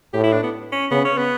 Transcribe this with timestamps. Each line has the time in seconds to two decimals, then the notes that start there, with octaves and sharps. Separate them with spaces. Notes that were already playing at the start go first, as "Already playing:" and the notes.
0.13 A2 G4
0.24 E4
0.32 D4
0.43 B3
0.72 C#4
0.91 C#3 B3
1.05 C#4
1.18 B3